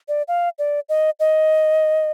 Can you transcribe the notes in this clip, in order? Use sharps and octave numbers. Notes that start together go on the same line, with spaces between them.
D5
F5
D5
D#5
D#5